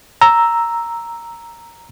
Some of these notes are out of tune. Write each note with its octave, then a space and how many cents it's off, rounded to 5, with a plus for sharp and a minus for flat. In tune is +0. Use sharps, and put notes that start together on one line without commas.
A#5 +0 E6 +0